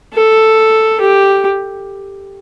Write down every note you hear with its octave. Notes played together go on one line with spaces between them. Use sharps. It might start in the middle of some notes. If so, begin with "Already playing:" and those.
A4
G4